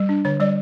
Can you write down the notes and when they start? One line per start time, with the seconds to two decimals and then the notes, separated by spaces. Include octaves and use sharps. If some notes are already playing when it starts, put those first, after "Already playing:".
Already playing: G3
0.09 D4
0.25 D3 C#5
0.40 G3 D5